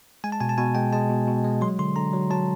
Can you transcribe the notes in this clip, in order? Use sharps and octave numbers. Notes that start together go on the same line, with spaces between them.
G#3 G#5
A5
B2 G#5
A5
B2 G#5
G#3 G5
G#3 A5
B2
B2
G#3
F#3 C6
D3 C6
D3 A#5
F#3
F#3 A5